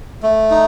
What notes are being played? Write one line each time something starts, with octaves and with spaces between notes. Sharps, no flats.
A3
D#4